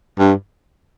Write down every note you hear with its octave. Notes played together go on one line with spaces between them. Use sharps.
G2